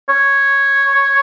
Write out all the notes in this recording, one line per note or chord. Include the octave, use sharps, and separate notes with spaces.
C#5